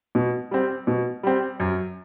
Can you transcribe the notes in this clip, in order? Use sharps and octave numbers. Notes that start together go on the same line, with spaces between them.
B2
G3 C4
B2
G3 C4
F#2